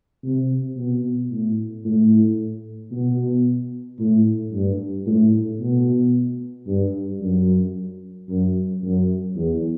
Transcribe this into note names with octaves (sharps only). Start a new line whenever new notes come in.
C3
B2
A2
A2
B2
A2
G2
A2
B2
G2
F#2
F#2
F#2
E2